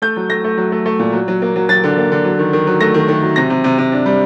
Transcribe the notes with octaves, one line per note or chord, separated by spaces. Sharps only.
A3 G6
F#3
A3 A#6
A3
F#3
A3
A3
A#2
F#3
F#3
A#3
F#3
F#3 A6
D3
A#3
D3
F#3
D#3
D#3
F#3
A3 A#6
D#3
D#3
F#3
C3 A#6
C3
C3
C3
D4
G3